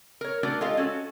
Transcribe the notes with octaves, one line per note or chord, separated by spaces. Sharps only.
A#4 C#5
A3 D4 F#4 A#4 D5
G#3 F4 G4 A4 D#5 F5
C#4 F#4 A4